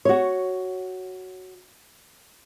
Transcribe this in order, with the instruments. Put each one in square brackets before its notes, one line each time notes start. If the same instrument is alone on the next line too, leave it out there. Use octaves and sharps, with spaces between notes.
[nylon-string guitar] F#4 C#5